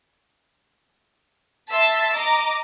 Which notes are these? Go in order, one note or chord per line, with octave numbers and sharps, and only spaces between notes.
E5 A5 C6 E6 A6 B6
D#5 A#5 D6